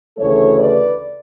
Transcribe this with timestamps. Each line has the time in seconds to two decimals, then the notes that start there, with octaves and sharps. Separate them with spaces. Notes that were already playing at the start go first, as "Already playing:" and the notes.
0.18 D2 C#3 E3 A3 A4 C#5
0.58 B4 D5